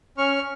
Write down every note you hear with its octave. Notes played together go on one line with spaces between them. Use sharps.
C#4 C#6 F6